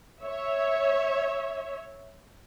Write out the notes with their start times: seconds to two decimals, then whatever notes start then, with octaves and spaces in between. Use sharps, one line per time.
0.22 C#5 E5